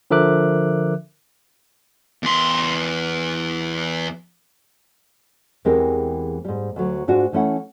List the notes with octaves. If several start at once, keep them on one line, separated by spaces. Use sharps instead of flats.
D3 F3 A#4 E5 D6 F#6
E2 C6
E2 E3 G#3 C4 G4 A#4
G#2 G3
D2 F#3
G#2 D4 F4 F#4
E3 A3 C#4 E4 F#5